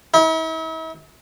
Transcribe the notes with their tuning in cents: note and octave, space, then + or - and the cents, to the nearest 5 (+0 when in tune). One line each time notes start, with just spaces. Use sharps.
E4 -45